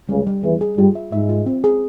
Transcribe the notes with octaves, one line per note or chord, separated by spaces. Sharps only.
C#2 C#3 G3
G3
E2 E3 G#4
G#4
G2 G3 F4
E5
G#2 G#3 E5
F4
C4
G#4